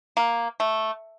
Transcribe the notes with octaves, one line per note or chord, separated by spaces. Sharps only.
A#3
A3